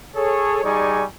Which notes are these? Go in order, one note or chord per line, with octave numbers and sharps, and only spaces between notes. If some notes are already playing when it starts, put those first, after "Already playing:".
G#4 A4 C#5
G3 D#4 G#4 D5 G#5 C#6